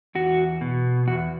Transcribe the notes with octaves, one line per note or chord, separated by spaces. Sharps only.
E2 F#4
B2
E2 F#4